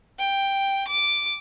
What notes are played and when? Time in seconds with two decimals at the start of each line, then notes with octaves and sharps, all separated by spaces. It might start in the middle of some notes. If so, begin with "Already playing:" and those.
0.19 G5
0.88 D6